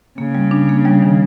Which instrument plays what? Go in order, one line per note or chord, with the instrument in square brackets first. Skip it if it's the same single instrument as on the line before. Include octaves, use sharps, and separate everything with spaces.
[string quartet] C#3 [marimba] A#3
[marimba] G3
D4
A#3
G3
D#3